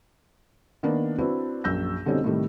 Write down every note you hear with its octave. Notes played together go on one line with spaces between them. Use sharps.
D#3 A#3 B3 D4
C4 D4 E4 F#4 B4
A#1 F#2 E6 G6 A#6
B2 D3 G3 C4 C#4 D#4
A2 C3 D#3 G3 A3